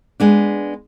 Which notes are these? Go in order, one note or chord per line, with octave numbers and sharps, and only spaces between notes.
G#3 B3 D4